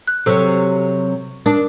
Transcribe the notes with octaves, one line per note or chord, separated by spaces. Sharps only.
F#6
C3 F#3 A4 C5 E6
D4 A#4